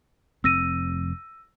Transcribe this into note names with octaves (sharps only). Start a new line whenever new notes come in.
F1 C4 E6 A#6 D#7